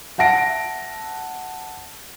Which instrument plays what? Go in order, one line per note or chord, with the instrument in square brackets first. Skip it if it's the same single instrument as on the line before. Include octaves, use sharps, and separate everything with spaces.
[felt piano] E5 F#5 A5 A#6 D7